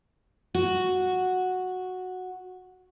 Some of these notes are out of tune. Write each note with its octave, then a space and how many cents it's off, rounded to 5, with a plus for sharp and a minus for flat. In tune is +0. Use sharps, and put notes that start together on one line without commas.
F#4 -5